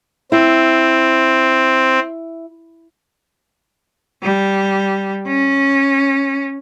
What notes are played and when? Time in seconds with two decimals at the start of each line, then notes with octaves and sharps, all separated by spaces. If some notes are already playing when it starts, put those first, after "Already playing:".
0.32 C4 E4
4.23 G3
5.27 C#4